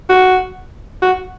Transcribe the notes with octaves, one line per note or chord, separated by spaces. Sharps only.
F#4
F#4